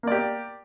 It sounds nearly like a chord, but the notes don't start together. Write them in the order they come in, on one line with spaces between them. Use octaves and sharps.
A#3 D5 G4